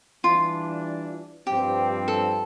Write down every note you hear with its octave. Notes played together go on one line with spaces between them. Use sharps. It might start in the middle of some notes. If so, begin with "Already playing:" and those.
E3 G3 D4 F4
G2 F3 C4 G4
A4